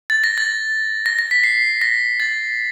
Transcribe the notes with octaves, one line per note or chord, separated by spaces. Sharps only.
A6
A#6
A6
A#6
A#6
B6
C7
A#6
A6